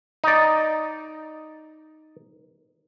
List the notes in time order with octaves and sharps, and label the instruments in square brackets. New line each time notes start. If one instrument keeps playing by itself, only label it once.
[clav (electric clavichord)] D#4 D5